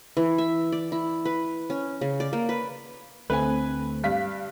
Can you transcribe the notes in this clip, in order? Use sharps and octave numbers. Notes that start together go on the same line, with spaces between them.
E3
E5
D5
E4
B4
C#4
C#3
D5
A#3
B4
D2 A3 C4 B4 G#5
G2 F5 B6